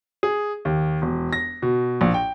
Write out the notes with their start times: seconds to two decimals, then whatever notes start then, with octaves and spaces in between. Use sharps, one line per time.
0.23 G#4
0.65 D#2
1.02 E1
1.33 A#6
1.62 B2
2.01 A#1
2.14 G5